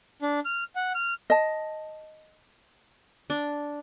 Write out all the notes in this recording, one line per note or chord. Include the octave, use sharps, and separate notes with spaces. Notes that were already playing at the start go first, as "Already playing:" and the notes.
D4
F6
F#5
F6
D#5 A5
D4